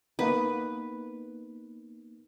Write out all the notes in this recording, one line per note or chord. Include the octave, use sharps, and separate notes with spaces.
A#3 B3 D#4 B4